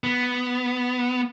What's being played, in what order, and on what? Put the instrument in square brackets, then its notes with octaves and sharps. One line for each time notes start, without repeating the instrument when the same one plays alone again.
[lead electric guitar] B3